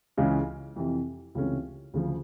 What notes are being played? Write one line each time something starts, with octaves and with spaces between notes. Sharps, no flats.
C#2 C#3 E3 G#3 C#4
F2 C3 E3
C#2 C3 E3 A3 C#4
D2 C#3 F3